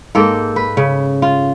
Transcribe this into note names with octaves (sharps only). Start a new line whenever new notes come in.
G#2 A#3 A4 G5
B4
C#3
F4